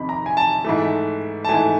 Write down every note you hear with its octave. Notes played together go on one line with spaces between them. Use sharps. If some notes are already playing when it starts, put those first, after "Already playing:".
Already playing: F2 C3 D#3 B5
A#5
G#5
A5
G#2 E3 A3
A5
G#2 E3 A3 G#5